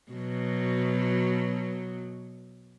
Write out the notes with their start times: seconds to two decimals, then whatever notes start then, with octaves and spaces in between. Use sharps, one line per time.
0.12 B2 F#3